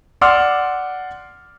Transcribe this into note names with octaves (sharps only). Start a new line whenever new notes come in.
D5 F#5 C6 D6 E6 F6